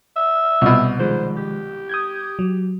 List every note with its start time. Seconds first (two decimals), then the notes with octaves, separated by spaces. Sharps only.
0.16 E5
0.61 C2 B2
0.99 D#3 F3 G#3 C5
1.37 G4
1.89 D#6 G6 G#6
2.39 F#3